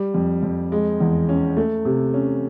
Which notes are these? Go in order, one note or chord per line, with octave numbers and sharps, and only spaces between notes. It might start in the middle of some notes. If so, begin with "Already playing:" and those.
Already playing: G3
F2
F2
G#3
E2
C#4
A3
C3
C#4